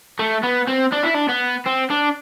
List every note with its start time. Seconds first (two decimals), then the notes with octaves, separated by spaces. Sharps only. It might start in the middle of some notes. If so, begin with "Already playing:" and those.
0.19 A3
0.44 B3
0.68 C4
0.93 D4
1.03 E4
1.15 D4
1.29 B3
1.66 C4
1.91 D4